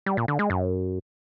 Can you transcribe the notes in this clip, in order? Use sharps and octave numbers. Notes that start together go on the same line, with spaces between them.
G3
A#2
D3
G#3
F#2